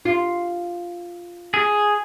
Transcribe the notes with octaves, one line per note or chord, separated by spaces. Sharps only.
F4
G#4